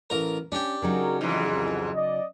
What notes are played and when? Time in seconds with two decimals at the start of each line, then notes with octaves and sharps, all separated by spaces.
0.10 A1 A#4
0.52 C#4 D4 G4
0.82 C#3 F#3 D#4 F#4 G#4 A#4
1.21 F2 G#2 E3 F3
1.50 C2 F2
1.94 D5 D#5